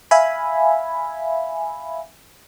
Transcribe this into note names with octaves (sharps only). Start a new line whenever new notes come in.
E5 F5 G#5 B5